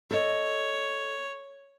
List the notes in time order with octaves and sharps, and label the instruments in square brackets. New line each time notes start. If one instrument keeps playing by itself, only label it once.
[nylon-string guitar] A4 D#5 [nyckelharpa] C#5